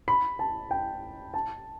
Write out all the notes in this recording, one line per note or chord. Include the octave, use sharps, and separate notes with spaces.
B5
A5
G5
A5